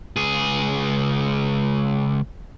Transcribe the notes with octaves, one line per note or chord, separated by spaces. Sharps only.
C#2 G#4